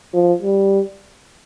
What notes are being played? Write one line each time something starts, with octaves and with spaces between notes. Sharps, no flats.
F3
G3